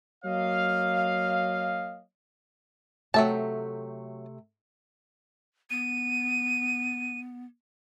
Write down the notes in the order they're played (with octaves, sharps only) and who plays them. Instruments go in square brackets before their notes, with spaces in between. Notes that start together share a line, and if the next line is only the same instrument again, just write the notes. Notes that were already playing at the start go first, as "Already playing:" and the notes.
[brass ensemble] F#3 A#3 C#5 D#5 F5
[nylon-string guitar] C3 A3 G5 [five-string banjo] F#3 E5 A5
[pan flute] B3 [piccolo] D#7